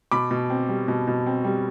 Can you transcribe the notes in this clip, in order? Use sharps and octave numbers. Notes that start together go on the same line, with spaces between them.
B2 B5 D6
B2
C4
G3
B2
B2
C4
G3